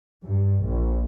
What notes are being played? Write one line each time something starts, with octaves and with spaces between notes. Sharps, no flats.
G2
A#1